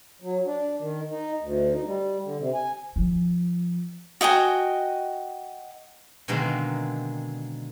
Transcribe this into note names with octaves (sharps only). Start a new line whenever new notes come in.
F#3
D4
D#3
D#4
D2
D#4
G3
D3
C3
G#5
F3
F#4 D#5 G5 G#5
B2 D3 D#3 G#3 A#3 C4